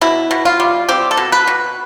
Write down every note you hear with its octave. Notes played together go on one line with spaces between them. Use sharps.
B2 E4
B2
F4
G3
C4 G4
A4
B2
B4
B2